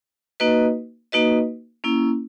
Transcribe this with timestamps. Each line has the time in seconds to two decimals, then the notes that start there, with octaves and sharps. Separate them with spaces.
0.40 A#3 D#4 F#4 B4 D#5
1.12 A#3 D#4 F#4 B4 D#5
1.84 A#3 C#4 E4